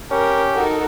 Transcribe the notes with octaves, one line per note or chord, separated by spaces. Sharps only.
C#4 G4 A#4
D#4 F#4 A4 A#4